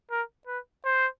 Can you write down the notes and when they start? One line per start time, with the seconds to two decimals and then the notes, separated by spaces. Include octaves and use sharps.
0.11 A#4
0.47 B4
0.85 C5